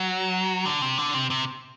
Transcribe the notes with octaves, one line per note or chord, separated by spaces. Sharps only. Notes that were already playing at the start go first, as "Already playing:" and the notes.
Already playing: F#3
D3
C3
D3
C3
C3